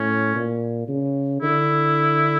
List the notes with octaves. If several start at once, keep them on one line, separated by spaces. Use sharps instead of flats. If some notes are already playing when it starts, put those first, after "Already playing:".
Already playing: A2 C#4
A#2
C#3
D3 E4